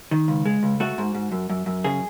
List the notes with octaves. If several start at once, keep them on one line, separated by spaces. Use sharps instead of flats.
D#3
C#2
G#3
C#2
A3 F#4
G#2
G#2
F#2
F#2
F#2
C#3 G#4